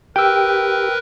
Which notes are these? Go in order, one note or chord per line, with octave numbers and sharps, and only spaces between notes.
G4 A#4 B4 G5 E6